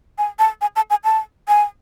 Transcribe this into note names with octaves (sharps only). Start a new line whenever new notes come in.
G#5
A5
G#5
A5
G#5
A5
G#5